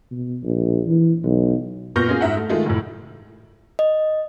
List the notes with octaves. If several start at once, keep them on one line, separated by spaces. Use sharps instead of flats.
B2
A#1
E3
B1
A#2 B3 C#6 F6 G6 A#6
A#3 C#4 F4 G#4
G#2 E5 F#5
A3
D#3 G#3 A3 F4
F1 A2
D#5